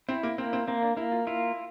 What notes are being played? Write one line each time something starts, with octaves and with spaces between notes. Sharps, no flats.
C4 E4
A#3
A#3 C4
C4
A#3 C4
D4
A#3 E4
F4
E4 F4